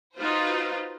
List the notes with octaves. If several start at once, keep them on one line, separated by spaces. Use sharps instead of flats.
D#4 F4 F#4 B4 C5